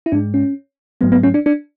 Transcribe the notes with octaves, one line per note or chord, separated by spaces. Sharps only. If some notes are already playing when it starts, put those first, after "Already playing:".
E4
G#2 G#3 D4
C#4
G#2 F#3 A3 B3
B3
C#4
D4
D4